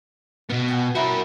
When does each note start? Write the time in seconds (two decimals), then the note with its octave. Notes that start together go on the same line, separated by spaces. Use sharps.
0.50 B2 B3 F5
0.68 F#4 G5 G#5
0.95 E4 F#4 A#4 G5 B5